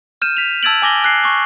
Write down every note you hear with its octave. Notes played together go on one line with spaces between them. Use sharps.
F6 G6 D#7 E7
B6 F7
A5 E6 G#6 A6 D7 F#7
G#5 D6 A#6 G7
F#6 C7
C#6 D6